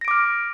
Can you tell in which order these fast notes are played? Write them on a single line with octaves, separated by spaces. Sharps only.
A#6 D7 D6 F6